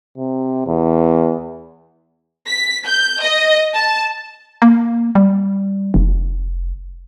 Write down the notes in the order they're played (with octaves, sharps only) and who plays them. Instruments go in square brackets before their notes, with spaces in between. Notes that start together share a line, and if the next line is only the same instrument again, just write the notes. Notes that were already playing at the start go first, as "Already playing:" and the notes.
[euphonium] C3
E2
[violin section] B6
G6
D#5
A5
[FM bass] A#3
G3
F1